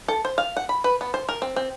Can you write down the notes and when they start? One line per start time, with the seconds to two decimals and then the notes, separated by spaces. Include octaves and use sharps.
0.08 A4
0.25 C5
0.38 F5
0.57 F#5
0.69 B5
0.84 B4
1.01 B3
1.14 C5
1.29 A#4
1.42 C4
1.56 C4